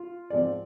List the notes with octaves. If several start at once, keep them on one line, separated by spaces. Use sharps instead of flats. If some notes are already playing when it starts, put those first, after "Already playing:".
Already playing: F4
G#2 F3 C4 D5